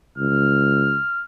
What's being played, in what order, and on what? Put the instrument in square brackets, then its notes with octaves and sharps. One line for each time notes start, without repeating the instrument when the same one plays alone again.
[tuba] C#2 [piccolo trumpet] F6